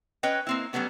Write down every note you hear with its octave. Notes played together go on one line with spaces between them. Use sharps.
C#4 B4 C#5 D#5 G5
A#3 C4 E4
F#3 G3 A3 B3 C#4